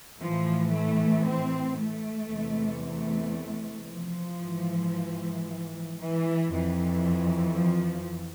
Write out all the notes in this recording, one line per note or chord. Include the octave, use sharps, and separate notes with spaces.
A2 E3 F3
A3
C4
A3
E2 C3 E3
A3
F3
G#2 E3
E3
F2 E3
F3